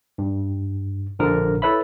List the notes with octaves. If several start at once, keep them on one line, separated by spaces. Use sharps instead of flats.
G2
A#1 D3 F3 A#4
E4 A4 B4 C#5 E5 B5